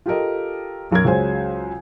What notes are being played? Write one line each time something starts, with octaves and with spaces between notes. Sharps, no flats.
F4 G4 A4 A#4 D#5
B1 F#2 A#4 G#6
C#2 C#3 F#3 C5 G#5